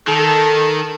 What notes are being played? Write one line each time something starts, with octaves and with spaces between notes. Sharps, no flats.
D#3 A4